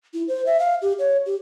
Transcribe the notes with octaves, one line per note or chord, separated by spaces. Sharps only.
E4
C5
E5
F5
G4
C#5
G4